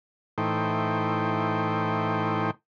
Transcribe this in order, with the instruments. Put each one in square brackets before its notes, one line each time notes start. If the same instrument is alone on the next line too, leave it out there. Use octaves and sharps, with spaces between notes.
[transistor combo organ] A2 E3 A3 D#4 C5 G5